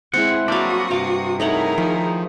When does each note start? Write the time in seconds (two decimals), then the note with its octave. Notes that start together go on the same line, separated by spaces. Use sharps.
0.14 G#3 C4 E4 G#4 F#5
0.48 F#3 G3 A#3 D4 F#4 F5 D#6
0.91 G2 C3 F5
1.40 A3 D#4 E4 G#4 A#4 C#5 F#5
1.78 D#3 F3 D#4